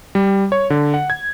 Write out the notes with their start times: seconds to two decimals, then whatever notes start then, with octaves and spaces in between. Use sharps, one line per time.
0.15 G3
0.52 C#5
0.70 D3
0.94 F#5
1.10 G#6